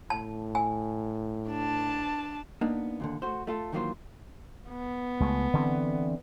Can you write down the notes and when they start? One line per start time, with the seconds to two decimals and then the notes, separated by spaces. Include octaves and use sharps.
0.10 A2 A5
0.55 G#5
1.49 D4 A5
2.61 A#3 B3 D4 D#4
3.00 D#2 A#2 D3
3.22 A3 F#4 C5
3.47 A3 F4 A4
3.73 D#3 E3 F#3 A#3 F4 C5
4.70 B3
5.20 C#2 G#3 A3
5.53 D3 E3 C4